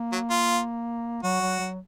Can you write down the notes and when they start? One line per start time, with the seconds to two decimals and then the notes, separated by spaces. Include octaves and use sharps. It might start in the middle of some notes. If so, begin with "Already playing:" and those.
Already playing: A#3
0.12 F#3
0.30 F4
1.23 F#3 F#4
1.41 F#3
1.60 F#3